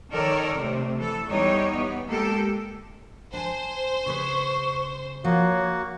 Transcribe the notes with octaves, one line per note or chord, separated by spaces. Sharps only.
D#3 A4 A#4 C#5 D5
C3 A3
E3 A4
E2 E3 G3 D#4 G4 C#5
B3
G#3 A#3 G4 A4
D4 C5 G#5
C#3 G#4 B4 C#6
F3 A#3 F#4 C#5